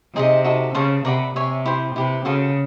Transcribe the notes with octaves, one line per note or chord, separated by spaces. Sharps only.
C3 D#4 G#4 C5 D#5
D#4 F#4 A4
C#3 C5 F5 A5 C#6
C3 A#4 D5 F#5 B5
C3 C#5 E5 G#5
E4 G4 C5
C3 E4 G4 B4
C#3 F#4 A4 C5 F5